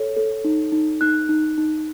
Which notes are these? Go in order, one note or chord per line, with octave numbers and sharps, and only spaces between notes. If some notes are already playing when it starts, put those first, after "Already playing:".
Already playing: A4 C#5
A4
D#4
D#4
D#4 F#6
D#4
D#4